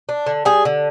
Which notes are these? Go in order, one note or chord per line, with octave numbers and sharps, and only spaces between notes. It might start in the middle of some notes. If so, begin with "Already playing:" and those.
D4
D3
G3 G#4
D3